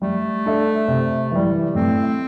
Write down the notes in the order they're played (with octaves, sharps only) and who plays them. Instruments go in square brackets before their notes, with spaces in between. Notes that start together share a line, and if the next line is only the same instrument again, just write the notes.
[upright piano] G3 [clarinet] A3
[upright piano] D4 A4 E5
C3
E3 G3
[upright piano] A2 [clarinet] C4